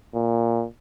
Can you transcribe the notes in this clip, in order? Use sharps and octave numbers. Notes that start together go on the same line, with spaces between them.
A#2